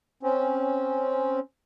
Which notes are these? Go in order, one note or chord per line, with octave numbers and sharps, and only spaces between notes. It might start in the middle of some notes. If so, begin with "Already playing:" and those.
C4 C#4